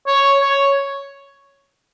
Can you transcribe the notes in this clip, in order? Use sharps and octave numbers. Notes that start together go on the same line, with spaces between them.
C#5
C#5